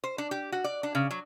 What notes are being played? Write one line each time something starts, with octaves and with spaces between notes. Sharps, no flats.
C5
D4
G4
F#4
D5
D4
C#3
F#3